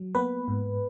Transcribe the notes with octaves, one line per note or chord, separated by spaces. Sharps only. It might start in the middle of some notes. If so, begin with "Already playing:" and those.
Already playing: F#3
A#3 B3 B4
G#2